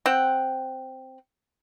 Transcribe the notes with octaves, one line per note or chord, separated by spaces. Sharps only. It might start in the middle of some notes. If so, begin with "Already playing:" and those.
C4 F#5 G5